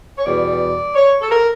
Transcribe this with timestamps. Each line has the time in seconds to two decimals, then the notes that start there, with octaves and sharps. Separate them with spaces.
0.18 C#5
0.26 E2 B2 G3 B3 D5
0.95 C#5
1.21 A4
1.30 A#4